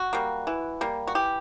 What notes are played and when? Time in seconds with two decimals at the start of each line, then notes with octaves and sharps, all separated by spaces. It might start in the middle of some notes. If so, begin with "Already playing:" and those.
Already playing: F#4
0.13 G3 A#3
0.47 E3
0.81 G3 A#3
1.07 F#4
1.15 E3 G4